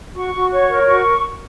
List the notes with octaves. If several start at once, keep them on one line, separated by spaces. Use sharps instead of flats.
F#4 C#6
F#4
C#5 C#6
A#4
F#4 C#6